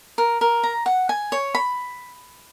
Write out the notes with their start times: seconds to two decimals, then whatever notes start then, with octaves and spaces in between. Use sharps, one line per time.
0.18 A#4
0.41 A#4
0.64 A#5
0.86 F#5
1.09 G#5
1.32 C#5
1.55 B5